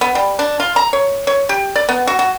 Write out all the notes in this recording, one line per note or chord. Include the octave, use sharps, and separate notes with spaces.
B3
G3
D4
F4
A#5
C#5
C#5
G4
D5
B3
F#4
F#4